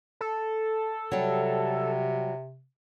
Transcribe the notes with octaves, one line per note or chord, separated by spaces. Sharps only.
A4
C3 F#3 G3